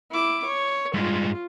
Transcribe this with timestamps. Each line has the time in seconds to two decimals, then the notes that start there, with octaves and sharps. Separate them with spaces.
0.11 E4 D6
0.45 C#5
0.94 G2 G#3 F4